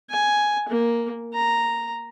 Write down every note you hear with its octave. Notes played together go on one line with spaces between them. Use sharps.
G#5
A#3
A#5